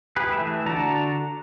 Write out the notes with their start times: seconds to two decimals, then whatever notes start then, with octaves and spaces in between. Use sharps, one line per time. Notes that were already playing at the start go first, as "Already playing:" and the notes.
0.16 G4 G#4 B4
0.33 E3 A3 E5
0.66 D3 F#4 D5 A5 A#5